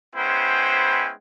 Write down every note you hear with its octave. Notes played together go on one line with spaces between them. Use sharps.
G#3 B3 C#4 E4 C5 G5